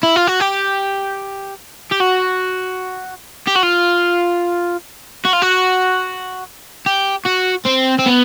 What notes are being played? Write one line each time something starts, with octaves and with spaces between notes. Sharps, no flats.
E4
F4
F#4
G4
G4
F#4
G4
F#4
F4
F#4
F4
F#4
G4
F#4
C4
C4
B3